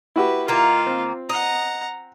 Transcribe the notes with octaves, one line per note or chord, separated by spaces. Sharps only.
E4 F#4 G4 B4
D#3 A#3 F4
C4
D#5 F#5 A#5